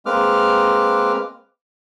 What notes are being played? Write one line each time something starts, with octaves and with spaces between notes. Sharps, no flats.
G#3 A#3 C4 B4 D6 F6